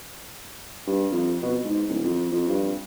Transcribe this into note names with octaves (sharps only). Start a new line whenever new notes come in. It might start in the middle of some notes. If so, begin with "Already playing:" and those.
G2
F2
B2
G#2
D1
F2
F2
G2